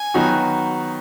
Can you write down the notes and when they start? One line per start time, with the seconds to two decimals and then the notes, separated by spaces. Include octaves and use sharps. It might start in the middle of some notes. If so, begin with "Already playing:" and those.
Already playing: G#5
0.14 D#3 F#3 B3 D#4 F#4